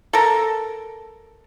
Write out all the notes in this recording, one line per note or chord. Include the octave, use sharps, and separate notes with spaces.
A4 A#4